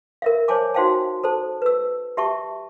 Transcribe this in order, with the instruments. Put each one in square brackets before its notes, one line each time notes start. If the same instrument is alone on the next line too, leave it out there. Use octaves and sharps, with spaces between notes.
[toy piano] A#4 E5 F5
C5 C#5 G#5 A5 D6
D#4 F#4 C5 F5 G5 A5
A4 C5 A5
B4 E6
G4 E5 A5 C#6